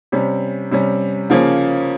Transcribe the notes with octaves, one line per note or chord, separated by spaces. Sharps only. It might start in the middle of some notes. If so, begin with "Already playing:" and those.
C3 G3 C#4
C3 G3 C#4
C#3 F3 A#3 C#4